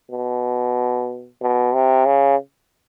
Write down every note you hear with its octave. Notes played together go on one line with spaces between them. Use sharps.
B2
B2
C3
C#3